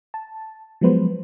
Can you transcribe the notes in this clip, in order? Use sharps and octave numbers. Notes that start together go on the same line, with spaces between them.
A5
F3 F#3 G#3 B3 B4 C5